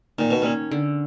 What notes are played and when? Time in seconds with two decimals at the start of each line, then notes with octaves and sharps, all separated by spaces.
0.18 A#2 D#3
0.31 B2
0.42 A#2 C#4
0.71 D3